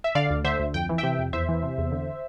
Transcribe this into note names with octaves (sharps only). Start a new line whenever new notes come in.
E5
D3 D5 F5
D2
D3 C5 E5
D2
F2 G5
E3
C3 E5 G5
F2
E2 C5 E5
E3
C3
E2
D3